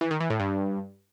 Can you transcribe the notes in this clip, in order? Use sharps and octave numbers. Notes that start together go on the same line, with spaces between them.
E3
D#3
E3
A2
G2